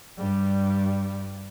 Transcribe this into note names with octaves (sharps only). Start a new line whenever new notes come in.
G2 G3